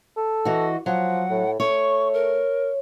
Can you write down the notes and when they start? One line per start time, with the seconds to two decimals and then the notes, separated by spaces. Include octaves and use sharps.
0.17 A4
0.45 E3 F#4 D#5
0.86 F3 F#3 F#5
1.30 A2
1.60 A3 C#5 C#6
2.14 A#4